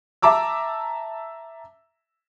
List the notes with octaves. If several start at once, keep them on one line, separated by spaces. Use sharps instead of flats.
E5 A5 A#5 D6 E6